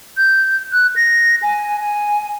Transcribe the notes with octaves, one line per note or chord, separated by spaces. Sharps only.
G6
F#6
A#6
G#5
G#5